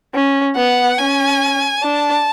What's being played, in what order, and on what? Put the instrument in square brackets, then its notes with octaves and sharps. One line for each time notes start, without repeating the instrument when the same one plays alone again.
[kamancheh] C#4
[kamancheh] B3 [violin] F#5
[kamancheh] C#4 [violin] G#5
[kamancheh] D4 [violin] A5